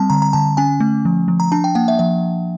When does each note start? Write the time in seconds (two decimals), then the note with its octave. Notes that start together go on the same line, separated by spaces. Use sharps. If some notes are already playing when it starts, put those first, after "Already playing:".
Already playing: G3 C4 A5
0.10 D3 A#5
0.22 A#5
0.33 D3 A5
0.57 C#4 G#5
0.80 A3
1.05 F3
1.28 F3
1.40 A#5
1.52 D4 A5
1.64 G5
1.75 A#3 F#5
1.88 E5
1.99 F3 E5